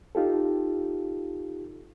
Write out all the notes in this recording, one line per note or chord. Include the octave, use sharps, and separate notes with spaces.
D#4 F4 G4 A4